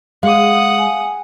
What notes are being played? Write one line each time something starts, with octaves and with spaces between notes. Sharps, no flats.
G#3 F5 F#5 D#6
G#5